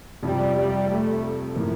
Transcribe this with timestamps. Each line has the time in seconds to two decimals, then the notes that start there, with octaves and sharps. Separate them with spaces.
0.23 F2 C3 F3 G3
0.56 G3
0.89 A3
1.55 A2 F3 A#3